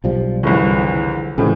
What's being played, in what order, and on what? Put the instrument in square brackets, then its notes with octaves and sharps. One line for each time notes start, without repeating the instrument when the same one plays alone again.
[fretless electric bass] B1 F3 G3
[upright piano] F#1 C2 [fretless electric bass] D3 E3 F3
[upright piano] A2 E3 [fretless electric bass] C#3 F3 G3